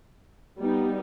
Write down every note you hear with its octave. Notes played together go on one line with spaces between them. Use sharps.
G3 B3 D#4